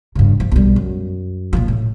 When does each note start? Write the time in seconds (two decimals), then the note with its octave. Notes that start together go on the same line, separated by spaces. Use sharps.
0.15 G2 C#3
0.40 F3
0.52 B1 G3
0.76 F#2
1.53 A#2 F3
1.68 A2